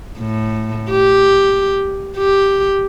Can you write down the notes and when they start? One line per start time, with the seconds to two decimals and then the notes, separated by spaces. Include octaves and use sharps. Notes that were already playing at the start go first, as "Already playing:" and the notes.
0.19 A2
0.90 G4
2.17 G4